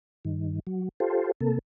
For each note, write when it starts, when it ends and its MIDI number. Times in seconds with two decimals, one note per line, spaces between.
0.25 0.60 43
0.25 0.60 51
0.67 0.89 54
1.00 1.31 65
1.00 1.31 67
1.00 1.31 69
1.00 1.31 72
1.41 1.59 48
1.41 1.59 58
1.41 1.59 69